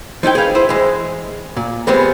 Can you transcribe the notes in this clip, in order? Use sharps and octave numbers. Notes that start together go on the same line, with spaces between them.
F3 D#4 E4 G5
G#4 B4 F5
E4 C5 E5
E3 G#3
A#2
E3 G3 G#3 B3 C4